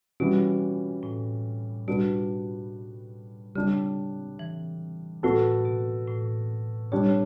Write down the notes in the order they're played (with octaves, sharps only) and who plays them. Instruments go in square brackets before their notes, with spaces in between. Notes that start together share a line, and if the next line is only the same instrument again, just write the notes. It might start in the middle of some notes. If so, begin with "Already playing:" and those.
[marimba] B2 [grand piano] E3 G3 C#4 F#4
[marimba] A2
[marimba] B2 [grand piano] G3 D4 F#4 B4
[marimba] C#3 [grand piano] G3 D4 G4
[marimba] E3
[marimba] A2 [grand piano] B3 F#4 A4
[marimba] B2
A2
[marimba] B2 [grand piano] G3 D4 G4 C#5